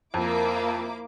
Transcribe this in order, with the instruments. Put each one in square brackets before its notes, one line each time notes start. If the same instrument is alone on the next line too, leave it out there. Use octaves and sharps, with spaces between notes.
[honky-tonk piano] F2 [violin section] A#3 E4 D6